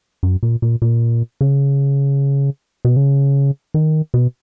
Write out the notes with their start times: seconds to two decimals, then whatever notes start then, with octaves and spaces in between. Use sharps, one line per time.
0.23 F#2
0.43 A#2
0.62 A#2
0.82 A#2
1.41 C#3
2.85 B2
2.96 C#3
3.74 D#3
4.14 B2